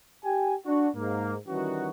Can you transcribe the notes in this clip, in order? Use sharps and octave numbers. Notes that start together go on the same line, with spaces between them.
G4 G5 G#5
D4 F#4
G#2 A#3
D#3 E3 G3 C#4 D#4 F#4